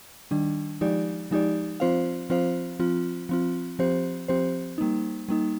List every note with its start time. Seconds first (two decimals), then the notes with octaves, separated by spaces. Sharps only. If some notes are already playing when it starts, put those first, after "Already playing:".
0.31 D#3 G3 D4
0.81 F3 G#3 D#4 G4 D5
1.31 F3 G#3 D#4 G4 D5
1.80 F3 C4 F4 C5 F5
2.30 F3 C4 F4 C5 F5
2.79 F3 C4 F4
3.29 F3 C4 F4
3.79 F3 C4 G4 C5
4.28 F3 C4 G4 C5
4.78 G3 A#3 D#4
5.28 G3 A#3 D#4